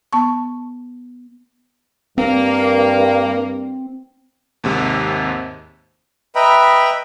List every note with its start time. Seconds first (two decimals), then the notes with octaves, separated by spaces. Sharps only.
0.13 B3 A5 C#6
2.18 G2 A#3 C4
4.64 D#2 G#2 C3
6.35 B4 D#5 E5 G5 A#5 B5